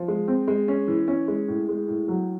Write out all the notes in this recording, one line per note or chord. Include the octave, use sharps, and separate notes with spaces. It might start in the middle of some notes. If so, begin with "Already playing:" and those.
Already playing: F3
G#3
C4
G#3
C#4
E3
C#4
G#3
A2
G#3
A2
F#3